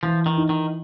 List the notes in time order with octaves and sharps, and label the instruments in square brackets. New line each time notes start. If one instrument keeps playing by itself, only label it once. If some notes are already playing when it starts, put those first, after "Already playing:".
[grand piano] E3 [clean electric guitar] F3
[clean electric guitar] D#3
[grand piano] D#4
[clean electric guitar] D#3